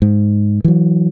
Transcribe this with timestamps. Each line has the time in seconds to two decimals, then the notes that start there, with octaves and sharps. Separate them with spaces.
0.02 G#2
0.64 E3 F#3